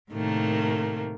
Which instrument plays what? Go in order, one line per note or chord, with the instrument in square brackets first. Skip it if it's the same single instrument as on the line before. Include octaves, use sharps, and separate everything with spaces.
[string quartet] A2 C3 D#3 A3 A#3